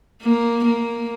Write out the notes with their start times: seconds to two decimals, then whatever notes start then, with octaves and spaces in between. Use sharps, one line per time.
0.23 A#3
0.65 A#3